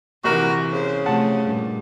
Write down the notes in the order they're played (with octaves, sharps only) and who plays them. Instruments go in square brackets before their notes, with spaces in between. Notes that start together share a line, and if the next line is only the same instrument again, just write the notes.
[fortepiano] A#1 A#4 [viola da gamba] C3 E3 G4 [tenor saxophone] F#4
[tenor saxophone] C#3 [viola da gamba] C5
[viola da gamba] C3 F3 A3 [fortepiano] F#5 A5
[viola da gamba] G2 A#2 G3